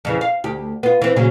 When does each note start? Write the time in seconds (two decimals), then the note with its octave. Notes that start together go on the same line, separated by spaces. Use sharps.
0.05 F2 C#3 E3
0.21 F5
0.44 D2 G4
0.83 B3 F4
1.02 E3 C4
1.16 A#2 C#3 F#3